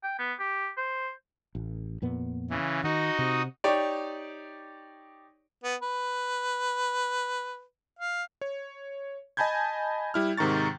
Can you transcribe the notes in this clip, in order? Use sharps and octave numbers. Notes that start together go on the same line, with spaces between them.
G5
B3
G4
C5
A1
F2 A#2 B3
C#3 E3
D#3 D#4 F#4 D#5
C3
D#4 G4 C#5 D5
B3
B4
F5
C#5
D#5 G#5 A5 B5 G6 G#6
G3 E4 F6
G#2 C3 D#3 A#5 C#6 A6